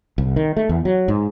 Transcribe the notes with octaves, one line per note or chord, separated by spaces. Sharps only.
C2
D#3
A3
E2
F#3
G#2